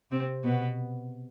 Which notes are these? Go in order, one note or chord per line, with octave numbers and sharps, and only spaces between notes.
C3 C4
B2 B3